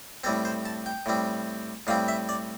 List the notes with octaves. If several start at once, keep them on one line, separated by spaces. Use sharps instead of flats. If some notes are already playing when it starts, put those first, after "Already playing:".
A2 G3 C4 A4
C5
A5
G5
A2 G3 C4
A2 G3 C4 F5
E5
D5